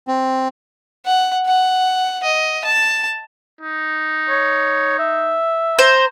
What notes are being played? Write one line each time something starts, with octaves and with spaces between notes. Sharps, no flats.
C4
F#5
F#5
D#5
A5
D#4
C#5
E5
C5 A#5